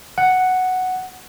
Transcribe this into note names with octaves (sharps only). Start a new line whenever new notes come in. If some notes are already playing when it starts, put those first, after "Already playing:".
F#5